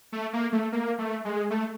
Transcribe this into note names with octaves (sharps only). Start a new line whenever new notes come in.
A3
A#3
A3
A#3
A3
G#3
A3